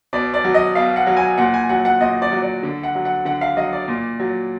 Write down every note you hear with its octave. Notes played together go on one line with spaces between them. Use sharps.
B2 D5
D5
F#3
D#5
B2 F5
F#5
F#3
G#5
A#2 F#5
G#5
F#3 F#5
F#5
A#2 D#5
D5
F#3
D5
D3
F#5
F#3
F#5
D3 F#5
F5
F#3 D#5
D5
A#2
F#3